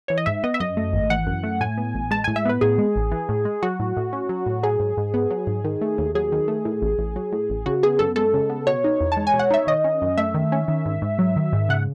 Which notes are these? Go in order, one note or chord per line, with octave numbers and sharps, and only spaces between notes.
E3 C#5
D#5
G#2 E5
B3 D#5
E5
F#2 D#5
A3
G#1
E3 F#5
F#2
A3
A2 G#5
B3
A1
G#3 A5
A2 G#5
E5
B3 B4
A2 G#4
G#3
A1
E3
A2
G#3
F#3 F#4
A2
A2
C#4
F#3
A2
F#3 G#4
G#2
G#2
B3
F#3
G#2
D#3
A3
D#2
F#3 G#4
D#3
A3
A2
A1
A1
F#3
A2
A1
C#3 F#4
B3 G#4
F#2 A4
G#3 A4
C#3
B3
B2 C#5
D#4
E2
A5
G#3
G#5
B2
F#5
D#4 E5
D#3 D#5
C#4
F#2
A3 E5
D#3
C#4
D#3
G#2
G#2
F#3
D#3
G#2
C#3 F#5